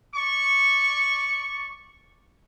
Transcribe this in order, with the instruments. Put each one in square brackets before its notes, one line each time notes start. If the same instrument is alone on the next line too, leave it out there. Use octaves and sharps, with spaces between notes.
[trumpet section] D5 C#6